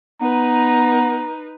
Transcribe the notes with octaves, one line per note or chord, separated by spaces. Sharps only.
B3 D#4 B4 A#5